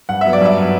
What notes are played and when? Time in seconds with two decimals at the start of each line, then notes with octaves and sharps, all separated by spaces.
0.09 G2 F#5
0.21 F#3 B3 E5
0.33 D5
0.41 G2 E5
0.57 F#3 B3